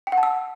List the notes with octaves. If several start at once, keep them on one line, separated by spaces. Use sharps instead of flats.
G5
F#5
A5
E6